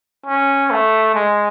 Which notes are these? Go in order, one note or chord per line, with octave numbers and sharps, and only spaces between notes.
C#4
A3
G#3